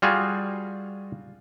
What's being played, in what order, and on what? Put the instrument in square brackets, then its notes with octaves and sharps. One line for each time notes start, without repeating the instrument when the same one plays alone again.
[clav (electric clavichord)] G3 F4 F#4 G#4